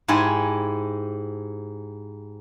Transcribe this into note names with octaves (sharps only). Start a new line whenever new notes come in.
G#2 E4 G4 G#5